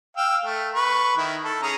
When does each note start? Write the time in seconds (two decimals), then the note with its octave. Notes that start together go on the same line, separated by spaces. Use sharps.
0.17 F5 G5 E6
0.45 A3
0.75 B4 C#6
1.17 D#3 E4
1.44 A4
1.63 C#4 G#4 A#5